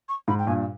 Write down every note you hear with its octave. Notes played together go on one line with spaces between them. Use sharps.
C#6
G#2 B5
G5
G2 A#2 G#5